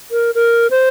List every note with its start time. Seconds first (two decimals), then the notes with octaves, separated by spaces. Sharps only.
0.11 A#4
0.35 A#4
0.71 C5